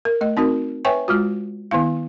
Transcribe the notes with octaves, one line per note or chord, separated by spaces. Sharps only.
A#4
A3 D#5
C4 D#4 F#4 A#4
B4 C#5 E5 G5 G#5 C#6
G#3 F4 F#4
D#3 B3 E4 F5